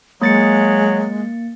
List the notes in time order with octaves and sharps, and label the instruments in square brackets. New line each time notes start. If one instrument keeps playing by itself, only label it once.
[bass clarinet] F#3 [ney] G#3 [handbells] A#3 A6 C#7